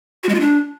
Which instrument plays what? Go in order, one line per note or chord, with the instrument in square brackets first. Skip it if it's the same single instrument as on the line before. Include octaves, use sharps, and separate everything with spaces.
[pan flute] F#4
G#3
F4
D4